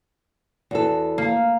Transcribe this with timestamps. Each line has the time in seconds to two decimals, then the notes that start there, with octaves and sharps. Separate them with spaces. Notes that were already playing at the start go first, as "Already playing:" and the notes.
0.71 E2 F#4 A4
1.18 A#3